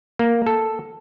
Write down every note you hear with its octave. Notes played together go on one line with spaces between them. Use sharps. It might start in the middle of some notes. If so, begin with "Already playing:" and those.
A#3
A4